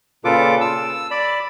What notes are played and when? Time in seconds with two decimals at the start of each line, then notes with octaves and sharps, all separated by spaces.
0.25 A#2 C#3 F4 A4 B4 D6
0.61 E6
1.11 D5 B5